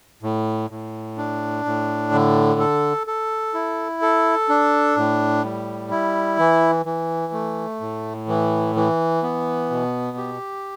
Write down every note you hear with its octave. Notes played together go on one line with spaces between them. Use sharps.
A2
A2
D4
A2
D3
A4
A4
E4
A4
D4
A2
G3
E4
E3
E3
A3
A2
E3
E3
B3
B2
G4